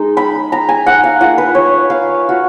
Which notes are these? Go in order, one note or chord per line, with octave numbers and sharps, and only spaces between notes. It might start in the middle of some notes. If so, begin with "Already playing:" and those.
Already playing: G#3 D#4
B5
A#5
G#5
F#5
F5
A#3 F4 F#5
B4
C#5
F5
F#4